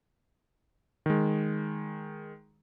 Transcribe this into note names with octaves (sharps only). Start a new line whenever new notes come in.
D#3 G#3